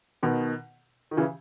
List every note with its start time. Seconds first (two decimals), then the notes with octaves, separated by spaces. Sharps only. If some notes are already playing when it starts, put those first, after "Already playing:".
0.23 B2 D#3
1.11 D#3
1.17 C#3 E3